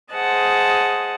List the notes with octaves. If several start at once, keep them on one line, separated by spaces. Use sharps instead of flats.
G#4 C5 D#5 F#5 A5